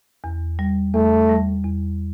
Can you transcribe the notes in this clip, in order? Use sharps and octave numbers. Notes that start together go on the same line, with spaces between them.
E2
G3
E2 A3
G3
E2